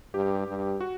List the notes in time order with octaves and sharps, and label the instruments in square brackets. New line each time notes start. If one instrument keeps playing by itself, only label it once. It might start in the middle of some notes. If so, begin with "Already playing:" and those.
[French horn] G2 [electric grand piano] G4
[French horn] G2
[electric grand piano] F#4